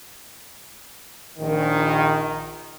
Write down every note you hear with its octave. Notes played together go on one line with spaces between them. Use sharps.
A#1 D#3